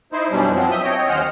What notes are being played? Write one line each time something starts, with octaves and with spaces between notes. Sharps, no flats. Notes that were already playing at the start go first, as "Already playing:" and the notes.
D#4 E4 C5
F#2 B2 G3 C#4 D4
F3 F#3 C4
E5 D#6 G6
C#5 D#5 G5
D#2 C#4 C5 D#5 F#5 F6